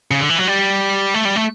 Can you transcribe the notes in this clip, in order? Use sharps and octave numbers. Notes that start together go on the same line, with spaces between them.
C#3
D3
E3
F#3
G3
A3
G3
A3